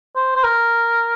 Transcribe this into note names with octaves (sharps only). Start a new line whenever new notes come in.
C5
C5
A#4